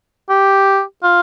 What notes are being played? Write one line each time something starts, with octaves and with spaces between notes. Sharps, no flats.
G4
F4